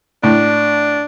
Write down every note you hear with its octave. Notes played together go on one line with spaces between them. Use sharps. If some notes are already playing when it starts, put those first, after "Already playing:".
A2 D4